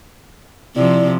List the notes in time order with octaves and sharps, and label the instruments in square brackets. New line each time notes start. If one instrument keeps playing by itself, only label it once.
[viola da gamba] C3 F3 [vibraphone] E4 D5